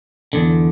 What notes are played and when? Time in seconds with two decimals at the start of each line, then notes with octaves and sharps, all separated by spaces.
0.33 E2 D3